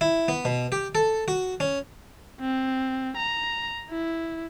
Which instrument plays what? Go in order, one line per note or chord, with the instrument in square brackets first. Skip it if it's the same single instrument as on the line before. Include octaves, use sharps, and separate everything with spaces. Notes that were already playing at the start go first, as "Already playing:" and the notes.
[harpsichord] E4
B3
B2
G4
A4
F#4
C#4
[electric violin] C4
A#5
E4